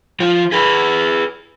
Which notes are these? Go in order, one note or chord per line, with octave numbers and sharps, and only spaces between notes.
F3 F4
G#4 B4